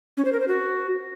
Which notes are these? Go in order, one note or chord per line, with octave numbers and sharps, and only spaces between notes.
C#4
C5
A#4
C5
F#4